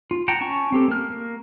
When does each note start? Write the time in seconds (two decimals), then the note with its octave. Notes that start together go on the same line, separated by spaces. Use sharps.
0.11 F4
0.28 F#5 G5 A5 A#5
0.41 C#4 A5 A#5 C#6
0.72 C4 G4 A4
0.88 A#3 F6
1.10 A#3